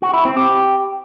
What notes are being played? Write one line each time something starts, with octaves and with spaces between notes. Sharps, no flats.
F#4
E4
C4
G4